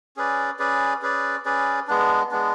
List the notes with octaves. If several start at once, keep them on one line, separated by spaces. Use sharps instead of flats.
C#4 G#4 B4 D5
C#4 G#4 B4 D5
C#4 G#4 B4 D5
C#4 G#4 B4 D5
G#3 B3 D4
G#3 B3 D4